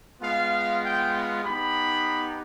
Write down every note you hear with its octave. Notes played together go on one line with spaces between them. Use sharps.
G#3 B3 F4 F5
G5
B3 D#4 G4 B5